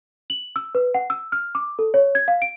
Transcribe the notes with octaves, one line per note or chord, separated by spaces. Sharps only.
F#7
E6
B4
F#5
E6
F6
D6
A4
C#5
G#6
F5
D7